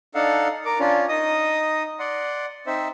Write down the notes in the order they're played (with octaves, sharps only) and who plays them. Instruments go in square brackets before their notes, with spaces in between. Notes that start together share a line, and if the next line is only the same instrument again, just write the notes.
[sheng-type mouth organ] D4 D#4 A4 F5 F#5
A#4 D6
C#4 D4 F4
D#4 D#5 D#6
D5 F#5 C6
C4 D#4 C5 E5